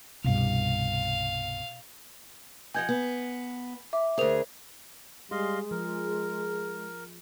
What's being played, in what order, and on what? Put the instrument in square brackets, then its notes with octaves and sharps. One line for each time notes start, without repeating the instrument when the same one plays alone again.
[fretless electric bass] C2 G2 [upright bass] B2 [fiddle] F5
[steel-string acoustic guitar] F3 D#5 F#5 [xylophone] G#5 G6 G#6
[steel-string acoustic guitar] B3
[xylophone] E5 D6
[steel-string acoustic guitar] D2 G#4 [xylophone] A#4 C5 F7
[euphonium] G3 [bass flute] G#3 [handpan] G#4 [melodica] D#5 F5 C6
[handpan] F3 [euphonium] G#4 [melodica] A#4